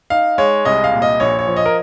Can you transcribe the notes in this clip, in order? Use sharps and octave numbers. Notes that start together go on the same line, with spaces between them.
D#4 F5
G#3 C#5
C2 D#5
F5
A#2
D#5
A#1 C#5
C#5
F3
D#5
A#4